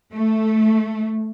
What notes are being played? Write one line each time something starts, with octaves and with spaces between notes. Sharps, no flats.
A3